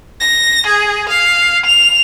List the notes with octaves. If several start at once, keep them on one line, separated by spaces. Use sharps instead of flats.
A#6
G#4
F5
F7